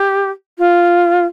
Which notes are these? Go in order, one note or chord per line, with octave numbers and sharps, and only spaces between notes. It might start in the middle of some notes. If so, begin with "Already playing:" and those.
Already playing: G4
F4